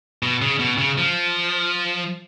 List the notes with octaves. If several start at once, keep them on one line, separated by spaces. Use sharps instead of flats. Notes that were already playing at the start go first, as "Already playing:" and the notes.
B2
C#3
B2
C#3
F3